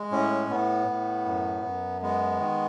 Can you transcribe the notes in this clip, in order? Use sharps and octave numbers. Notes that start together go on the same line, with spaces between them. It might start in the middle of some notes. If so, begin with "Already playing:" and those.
Already playing: G#3
A2 C#4
A2 B3
A2
F#2
F#2
G#3 B3
D#3